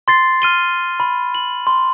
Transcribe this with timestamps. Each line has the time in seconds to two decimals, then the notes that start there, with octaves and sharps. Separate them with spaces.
0.08 C6 A6 C7
0.42 F6 D#7 G7
1.00 B5
1.35 F#7
1.67 C6